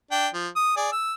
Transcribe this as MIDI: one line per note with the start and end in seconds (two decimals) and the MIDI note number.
0.11 0.27 62
0.11 0.27 79
0.34 0.48 53
0.56 0.74 87
0.77 0.89 68
0.77 0.89 74
0.92 1.14 88